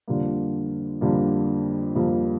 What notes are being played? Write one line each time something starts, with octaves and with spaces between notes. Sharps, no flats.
F2 D3 G3 A#3
F2 D3 G3 A#3
F2 D3 G3 A#3